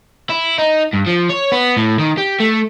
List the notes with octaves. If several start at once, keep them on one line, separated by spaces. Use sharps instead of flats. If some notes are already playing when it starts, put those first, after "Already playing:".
E4
D#4
G2
F3
C#5
B3
A2
D#3
G4
A3